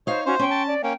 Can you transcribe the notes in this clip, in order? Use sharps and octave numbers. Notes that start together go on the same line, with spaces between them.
D#4 C5 C#5 F5
C#4 F#4 C5 C#6
C#4 G5 C6 C#6
A5
D5
A#3 C#4 G5